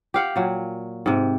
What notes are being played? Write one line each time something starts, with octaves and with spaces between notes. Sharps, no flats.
G4 F5 F#5
A#2 F#3
G#2 C3